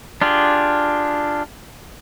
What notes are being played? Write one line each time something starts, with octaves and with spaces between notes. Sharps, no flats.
D4 F4 G4 G#4